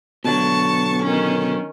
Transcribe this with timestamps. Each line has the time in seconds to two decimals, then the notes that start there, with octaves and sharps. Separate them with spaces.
0.25 B2 D3 F#3 A5 C#6
1.04 D#3 C#4